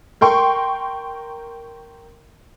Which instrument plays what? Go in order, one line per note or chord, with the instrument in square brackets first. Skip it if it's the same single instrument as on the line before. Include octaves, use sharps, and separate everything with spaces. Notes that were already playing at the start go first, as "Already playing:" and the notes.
[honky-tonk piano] A#4 G5 C6 C#6